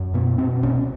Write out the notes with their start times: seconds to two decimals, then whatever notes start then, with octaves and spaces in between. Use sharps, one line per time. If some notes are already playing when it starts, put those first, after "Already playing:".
Already playing: F#2
0.14 B2 B3
0.38 B2 C4
0.63 C2 C#4